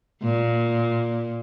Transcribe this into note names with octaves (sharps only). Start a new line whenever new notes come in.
A#2